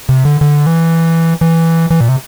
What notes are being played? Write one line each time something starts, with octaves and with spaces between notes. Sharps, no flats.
C3
D3
D3
E3
E3
E3
A#2
C3